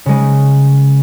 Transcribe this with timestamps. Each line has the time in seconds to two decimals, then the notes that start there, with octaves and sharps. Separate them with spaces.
0.06 C#3 G#3